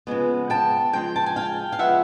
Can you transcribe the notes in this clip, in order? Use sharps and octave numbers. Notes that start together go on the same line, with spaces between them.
C#3 F3 G#3 B3
G5 A5
C#3 F3 G#3 G5
A5
G#5
F5 G5
F5
C#3 F3 G#3 B3 E5 F#5